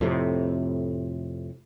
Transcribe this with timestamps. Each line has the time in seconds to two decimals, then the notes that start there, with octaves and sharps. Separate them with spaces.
0.01 F2 A2 C3